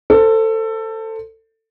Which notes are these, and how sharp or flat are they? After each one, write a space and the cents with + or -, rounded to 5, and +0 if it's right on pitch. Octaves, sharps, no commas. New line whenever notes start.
A4 +20 C5 +0